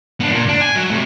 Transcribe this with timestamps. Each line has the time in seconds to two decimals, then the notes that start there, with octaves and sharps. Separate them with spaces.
0.20 B3 D4
0.31 A#2
0.48 D4
0.61 G#5
0.75 F#3
0.91 C3 A3